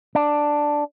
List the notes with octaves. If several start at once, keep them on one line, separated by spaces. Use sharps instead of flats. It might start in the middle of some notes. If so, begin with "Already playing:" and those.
D4